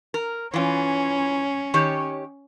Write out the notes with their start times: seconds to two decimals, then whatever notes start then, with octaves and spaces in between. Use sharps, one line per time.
0.14 A#4
0.54 E3 C#4 F4
1.74 D#3 G4 C#5